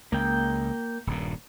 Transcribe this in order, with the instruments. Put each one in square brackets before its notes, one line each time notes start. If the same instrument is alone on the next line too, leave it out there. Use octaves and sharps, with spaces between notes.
[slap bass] C#2 [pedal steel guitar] A#3 G5
[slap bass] D#1 G2 A#2